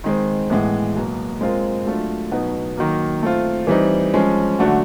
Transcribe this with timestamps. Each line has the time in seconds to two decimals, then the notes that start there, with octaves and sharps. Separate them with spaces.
0.04 D#3 G#3 C4
0.50 A2 E3 G#3 B3
0.95 B2 F#3 A#3
1.41 G#3 C4 F4 A#4
1.86 F#3 A3 D4 F4
2.31 B2 F#3 B3 D#4
2.77 D#3 F#3 A#3
3.22 A3 C4 F4
3.67 E3 G3 C4 D#4
4.14 F3 G#3 C#4
4.59 D3 F#3 A3 D4 F#4